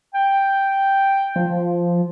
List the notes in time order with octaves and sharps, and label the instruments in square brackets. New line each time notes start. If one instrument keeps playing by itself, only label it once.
[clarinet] G5
[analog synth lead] F3